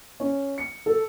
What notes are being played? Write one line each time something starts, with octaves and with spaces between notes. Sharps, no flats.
C#4
C#7
A4